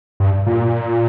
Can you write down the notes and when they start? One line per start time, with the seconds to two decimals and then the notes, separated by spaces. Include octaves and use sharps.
0.20 G2
0.47 A#2